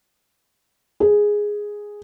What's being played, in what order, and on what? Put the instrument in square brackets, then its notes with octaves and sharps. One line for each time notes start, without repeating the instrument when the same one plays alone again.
[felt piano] G#4